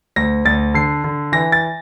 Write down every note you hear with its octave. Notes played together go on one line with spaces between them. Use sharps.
D2 A#6
D2 A6
D3 C7
D3
E3 A#6
A6